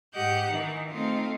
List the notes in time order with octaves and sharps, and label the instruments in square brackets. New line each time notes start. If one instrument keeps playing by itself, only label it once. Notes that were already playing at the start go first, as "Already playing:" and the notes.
[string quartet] G#2 G4 D#5 F#5 G6
D#3 E3 D#4
A3 C4 D#4 F4